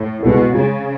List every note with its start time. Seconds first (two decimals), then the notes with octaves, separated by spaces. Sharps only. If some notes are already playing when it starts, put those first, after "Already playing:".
Already playing: A2
0.23 B2 G#3 B3 E4 A4
0.54 C#3 G#3